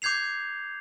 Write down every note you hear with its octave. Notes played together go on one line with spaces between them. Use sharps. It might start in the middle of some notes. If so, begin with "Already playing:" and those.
D6 G6 G#6 C7 F7